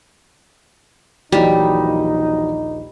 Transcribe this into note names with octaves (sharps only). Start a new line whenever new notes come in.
A#1 D#2 E3 F#3 G3 D#4